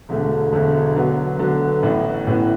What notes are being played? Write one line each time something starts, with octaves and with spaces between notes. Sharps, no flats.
E1 D2 D3 A3
E1 D2 D3 A3
D3 F#3 B3
D3 F#3 B3
A1 A2 E3 B3
A1 A2 E3 B3